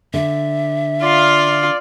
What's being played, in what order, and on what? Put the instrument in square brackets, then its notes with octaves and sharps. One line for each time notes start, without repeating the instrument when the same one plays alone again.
[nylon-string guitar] D3 [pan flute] E5
[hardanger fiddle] F4 F5 [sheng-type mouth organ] D5